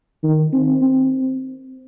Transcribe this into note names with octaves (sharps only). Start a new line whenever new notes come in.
D#3
C4
C4